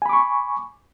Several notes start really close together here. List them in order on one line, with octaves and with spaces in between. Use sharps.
G#5 B5 D6 C#6